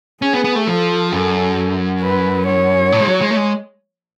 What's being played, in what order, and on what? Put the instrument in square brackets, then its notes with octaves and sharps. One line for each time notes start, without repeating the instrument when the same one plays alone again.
[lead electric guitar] C#4 [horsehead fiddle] G#4
[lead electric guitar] B3
B3
A3
[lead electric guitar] F3 [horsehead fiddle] A4
[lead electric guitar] F#2 [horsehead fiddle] A4
[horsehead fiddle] B4
C#5
[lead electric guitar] A2
G#3
F#3
G#3
A3
G#3